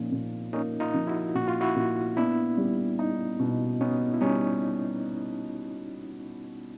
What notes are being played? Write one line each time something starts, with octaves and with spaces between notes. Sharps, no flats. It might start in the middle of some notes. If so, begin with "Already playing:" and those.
Already playing: A#2 F3 C#4 D#4
A#2
A#3 C#4 D#4
D#4 F4
F3
E4 F#4
A#2 F#4
F4
E4 F#4
A#2
B3 D4 E4
G3
D#4
B2
B3 C#4 D#4
E4
G3 C#4 D#4